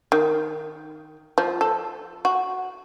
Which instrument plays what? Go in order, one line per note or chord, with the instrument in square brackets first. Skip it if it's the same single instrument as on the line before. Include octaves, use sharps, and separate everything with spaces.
[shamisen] D#3
F3
A4
F#4